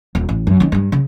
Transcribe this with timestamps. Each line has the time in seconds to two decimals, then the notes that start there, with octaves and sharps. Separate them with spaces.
0.15 D#1
0.29 A1
0.47 F#2
0.60 D#3 C#4
0.72 G2 G3
0.92 C#3